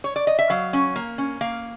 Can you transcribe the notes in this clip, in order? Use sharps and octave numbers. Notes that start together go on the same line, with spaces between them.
C#5
D5
D#5
E5
F#3 F5
C#4
A#3
C#4
A#3 F5